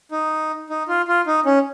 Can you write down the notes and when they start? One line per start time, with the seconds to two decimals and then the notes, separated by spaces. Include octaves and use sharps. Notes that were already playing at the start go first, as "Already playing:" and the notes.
0.12 D#4
0.70 D#4
0.88 F4
1.08 F4
1.27 D#4
1.45 C#4